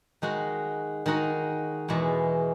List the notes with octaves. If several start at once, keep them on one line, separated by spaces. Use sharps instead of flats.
D#3 G#3 D#4 F#4
D#3 G#3 D#4 F#4
E2 B2 G#3